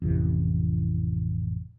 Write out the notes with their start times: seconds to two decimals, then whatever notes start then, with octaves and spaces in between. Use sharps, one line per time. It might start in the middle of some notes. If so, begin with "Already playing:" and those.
0.02 A1 F2 C3 E3